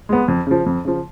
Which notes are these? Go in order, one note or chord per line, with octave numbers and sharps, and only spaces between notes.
G#3 B3
F2
C#3 F3
F2
C#3 F3